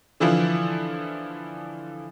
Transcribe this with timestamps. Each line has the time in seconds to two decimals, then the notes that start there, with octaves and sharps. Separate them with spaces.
0.20 D3 E3 F3 E4 F4